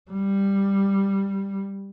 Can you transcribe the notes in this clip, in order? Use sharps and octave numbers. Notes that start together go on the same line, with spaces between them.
G3